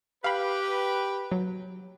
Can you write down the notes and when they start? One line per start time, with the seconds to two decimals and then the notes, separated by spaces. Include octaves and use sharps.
0.24 G4 B4 F5 B5
1.31 F#3